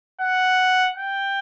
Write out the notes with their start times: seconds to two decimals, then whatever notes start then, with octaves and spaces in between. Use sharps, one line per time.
0.21 F#5
0.98 G5